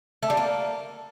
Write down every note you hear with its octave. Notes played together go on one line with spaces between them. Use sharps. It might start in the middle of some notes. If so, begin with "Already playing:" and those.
A3
G3
A#3